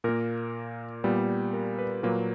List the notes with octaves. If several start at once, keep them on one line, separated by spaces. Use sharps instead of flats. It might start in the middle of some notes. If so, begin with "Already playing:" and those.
A#2 A#3 A#4
A#2 G3 B3 B4
A#4
B4
A#2 F#3 A#3 B4